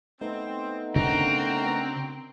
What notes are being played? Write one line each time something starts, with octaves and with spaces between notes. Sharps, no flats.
A3 B3 C4 D#4
C#3 C4 D4 F#4 A#4 A#5